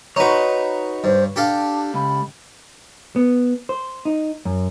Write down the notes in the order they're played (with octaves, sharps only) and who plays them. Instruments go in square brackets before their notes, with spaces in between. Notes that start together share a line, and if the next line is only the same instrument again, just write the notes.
[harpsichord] D#4 F#4 [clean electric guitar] B4 C#5
[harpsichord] G2 [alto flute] C5
[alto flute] D4 [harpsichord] G4 A4 F5
[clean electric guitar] C#2 [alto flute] B5
[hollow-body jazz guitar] B3
C5
D#4
F#2